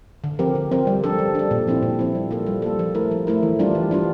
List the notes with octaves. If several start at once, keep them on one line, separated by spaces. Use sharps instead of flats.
D3
F3 C4 G4 A#4
D3
F3 C4 G4 A#4
G3
D4 A4
G3
D4 A4
A#2
F3 C4 E4
A#2
F3 C4 E4
G3
A#3 F4 A4
G3
A#3 F4 A4
F3
A3 E4 A#4
F3
A3 E4 A#4
E3
G3 D4 F4
E3
G3 D4 F4